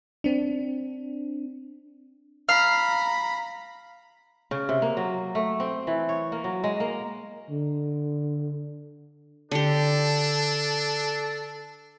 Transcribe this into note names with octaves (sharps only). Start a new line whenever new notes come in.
C4 D4
F5 A#5 B5
C#3
C3
A#3
F#3
A3
C4
E3
C#5
A#3
F#3
G#3
A#3
D3
D3 D4 G4 A4